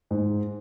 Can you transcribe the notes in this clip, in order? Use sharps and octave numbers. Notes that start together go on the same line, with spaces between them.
G#2